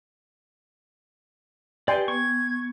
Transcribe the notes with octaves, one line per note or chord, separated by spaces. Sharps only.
G4 B4 D5 G5 G#5 C6
B3 C#6 G#6